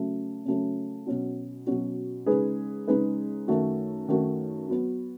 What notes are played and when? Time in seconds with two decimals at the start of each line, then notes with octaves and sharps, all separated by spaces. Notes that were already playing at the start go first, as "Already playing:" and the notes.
Already playing: C#3 F#3 A3 C#4
0.46 C#3 F#3 A3 C#4
1.06 B2 F#3 C#4 F#4
1.67 B2 F#3 C#4 F#4
2.26 C#3 G#3 D#4 G#4 B4
2.88 C#3 G#3 D#4 G#4 B4
3.48 F#2 D#3 A3 D#4 F#4
4.08 F#2 D#3 A3 D#4 F#4
4.69 F#3 B3 F#4